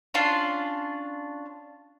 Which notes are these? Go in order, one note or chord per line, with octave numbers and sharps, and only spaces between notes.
C#4 D4 F4 C6